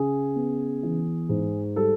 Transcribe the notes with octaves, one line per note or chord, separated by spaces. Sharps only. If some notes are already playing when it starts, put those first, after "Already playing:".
Already playing: C#3 G#4
B3
E3
G#2
G3 A4